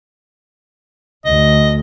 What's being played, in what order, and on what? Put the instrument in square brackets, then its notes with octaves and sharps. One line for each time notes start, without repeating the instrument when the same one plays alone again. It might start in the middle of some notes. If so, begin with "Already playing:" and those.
[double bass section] D2 [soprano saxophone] D#5